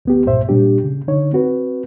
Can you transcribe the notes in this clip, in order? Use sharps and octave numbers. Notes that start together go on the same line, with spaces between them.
D2 B3 G4
C2 G2 A#2 C5 E5
A#2 G3 D4 G4
C#3
D3 D#4 C#5
C4 F#4 B4